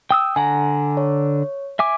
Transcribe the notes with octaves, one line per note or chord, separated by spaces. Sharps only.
G5 D#6 E6
D3 F#5 G#5 A#5
C#5
E5 G#5 D6